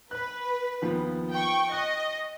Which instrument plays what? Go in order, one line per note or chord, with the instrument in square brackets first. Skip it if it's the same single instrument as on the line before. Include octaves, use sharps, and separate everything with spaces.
[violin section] B4 [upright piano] B5 F#6
[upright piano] D#2 F3 B3
[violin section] G5 C#6
[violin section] D#5 [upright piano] F#6